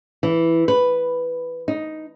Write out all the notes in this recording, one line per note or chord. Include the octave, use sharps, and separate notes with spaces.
E3
B4
D#4